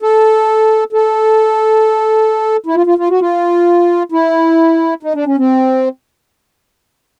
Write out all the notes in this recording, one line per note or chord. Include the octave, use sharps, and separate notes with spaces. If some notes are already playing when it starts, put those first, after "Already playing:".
A4
A4
E4
F4
F4
F4
F#4
F4
E4
D#4
D4
C#4
C4